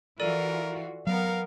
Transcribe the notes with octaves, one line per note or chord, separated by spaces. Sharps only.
E3 F4 F#4 A4 A#4 D5 D#7
F#3 B3 A#4 F5